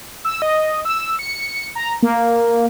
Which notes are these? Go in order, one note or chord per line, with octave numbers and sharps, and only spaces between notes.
E6
D#5
E6
C#7
A#5
A#3